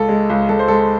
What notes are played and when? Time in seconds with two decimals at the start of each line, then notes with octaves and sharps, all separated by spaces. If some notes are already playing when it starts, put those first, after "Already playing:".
Already playing: C#2 A4
0.09 G#3
0.30 C#2
0.49 C#2 A4
0.59 C5
0.68 G#3 A4